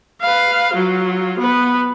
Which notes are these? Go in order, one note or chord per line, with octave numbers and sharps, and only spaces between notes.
B4 F5
F#3 F4
B3 B4